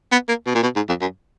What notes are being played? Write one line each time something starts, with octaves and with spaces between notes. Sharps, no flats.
B3
A#3
B2
A#2
B2
G#2
F2
F#2